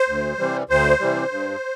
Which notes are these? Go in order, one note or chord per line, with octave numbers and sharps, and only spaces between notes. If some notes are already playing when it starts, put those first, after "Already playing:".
Already playing: C5
D2
C3 E3 G3
D2 C5
C3 E3 G3
G2